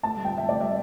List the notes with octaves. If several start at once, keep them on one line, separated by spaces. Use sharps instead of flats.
A2 A5
G3
G5
A2
E5
A2 D5
G3 E5